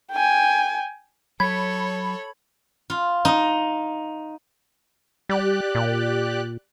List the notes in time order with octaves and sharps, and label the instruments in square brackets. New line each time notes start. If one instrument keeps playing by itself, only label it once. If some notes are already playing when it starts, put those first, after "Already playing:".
[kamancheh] G5 G#5
[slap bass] F#3 [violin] A4 C#5 [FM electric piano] B5 [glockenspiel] G#6
[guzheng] F4
D#4
[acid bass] G3 [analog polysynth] G4 D5 F#6
[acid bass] A#2